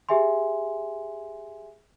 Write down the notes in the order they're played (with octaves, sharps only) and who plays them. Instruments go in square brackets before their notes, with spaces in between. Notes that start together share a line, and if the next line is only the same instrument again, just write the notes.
[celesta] G4 G#4 E5 G#5 C6